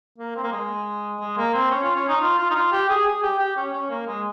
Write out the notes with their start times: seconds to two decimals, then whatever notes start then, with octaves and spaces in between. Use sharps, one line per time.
0.18 A#3
0.36 C4
0.44 A#3
0.52 G#3
1.20 G#3
1.37 A#3
1.54 C4
1.71 C#4
1.83 F4
1.96 C#4
2.08 D#4
2.21 F4
2.38 F4
2.51 D#4
2.55 F4
2.72 G4
2.89 G#4
3.06 G#4
3.23 G4
3.39 G4
3.57 C#4
3.73 C#4
3.90 A#3
4.07 G#3